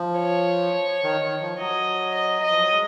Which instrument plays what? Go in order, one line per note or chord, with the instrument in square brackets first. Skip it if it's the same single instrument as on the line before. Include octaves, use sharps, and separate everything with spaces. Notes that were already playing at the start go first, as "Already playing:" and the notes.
Already playing: [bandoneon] F3
[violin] C#5
[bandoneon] D#3
D#3
F3
[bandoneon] F#3 [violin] D#5
[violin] D#5
D#5
[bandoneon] F3
F#3
G#3